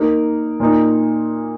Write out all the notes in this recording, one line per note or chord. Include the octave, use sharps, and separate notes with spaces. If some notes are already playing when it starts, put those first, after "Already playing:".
Already playing: A#3 D#4 A#4
A#2 A#3 D#4